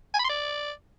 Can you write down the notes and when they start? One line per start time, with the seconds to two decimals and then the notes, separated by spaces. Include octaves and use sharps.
0.14 G#5
0.19 B5
0.24 C6
0.30 D5